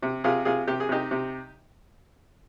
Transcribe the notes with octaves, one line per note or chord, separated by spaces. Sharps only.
C3
C3 F4 G#4
C3 F4 G#4
C3 G4
G#4
C3 D#4 G4
C3